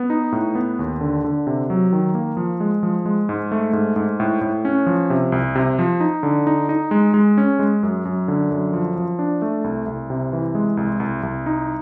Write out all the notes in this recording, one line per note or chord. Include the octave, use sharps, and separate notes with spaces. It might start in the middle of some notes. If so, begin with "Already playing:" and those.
Already playing: B3
D#4
A2
B3
D#2
D3
D3
C3
F#3
D#3
A#3
F3
G#3
F3
G#3
G#2
A3
G#2
G#2
A2
A2
C#4
F3
C3
C2
C3
F3
D#4
D3
D#4
D#4
G#3
G#3
C#4
G#3
F#2
F#2
D3
F#2
F3
F3
D4
A3
C2
C2
C3
E3
G#3
C2
C2
C2
D#4